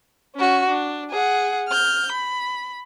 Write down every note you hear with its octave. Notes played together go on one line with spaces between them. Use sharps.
C#4 F#4
D4
G#4 F#5
F6 G6
B5